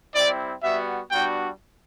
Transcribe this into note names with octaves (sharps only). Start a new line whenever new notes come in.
G3 C4 E4 D5
G3 B3 F#4 E5
G3 B3 D4 F#4 G5